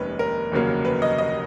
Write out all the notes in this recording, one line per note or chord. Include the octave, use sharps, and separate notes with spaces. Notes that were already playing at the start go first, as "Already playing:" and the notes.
Already playing: F1 D#2 D#3 G#3 C#4 B4
A#4
F1 D#2 C#3 F#3 A#3
B4
D#5
D#5